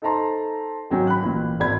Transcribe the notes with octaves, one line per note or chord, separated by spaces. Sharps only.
D#4 A4 C5 A5 A#5 C6
G#1 F#3 C#4 G5 G#5
B5 F#6
A1 A#2
G#1 D5 B5 G#6